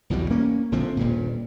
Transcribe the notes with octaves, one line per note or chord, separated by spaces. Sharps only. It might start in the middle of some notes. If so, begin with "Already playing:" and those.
B1 E2 B2 G3
A#3 C#4
A#1 D3 F3 C4
D#1 G2 A#2